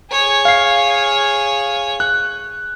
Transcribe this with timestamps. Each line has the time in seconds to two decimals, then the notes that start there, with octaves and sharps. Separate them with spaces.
0.11 G#4 C#5
0.45 F5 C7
2.00 F#6